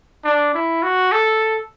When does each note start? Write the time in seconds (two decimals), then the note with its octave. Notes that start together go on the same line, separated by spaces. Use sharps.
0.24 D4
0.55 E4
0.83 F#4
1.12 A4